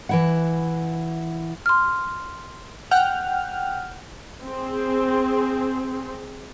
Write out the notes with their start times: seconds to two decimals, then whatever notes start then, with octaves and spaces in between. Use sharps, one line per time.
0.09 E3 E4 F#5
1.66 C6 F6
2.91 F#5 G5 F6
4.44 C4 G#4